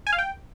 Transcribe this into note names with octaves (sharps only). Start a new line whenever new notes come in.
G#5
F5
G5